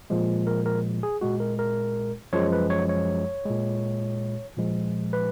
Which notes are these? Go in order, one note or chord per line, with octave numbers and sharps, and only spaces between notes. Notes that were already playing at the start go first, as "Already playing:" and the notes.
A#2 F3 G#3
A#4
A#4
G#4
A#2 G#3 F#4
A#4
A#4
F#2 F3 G#3 C#5
B4
C#5
C#5
A#2 G#3
A#2 F3 G#3
B4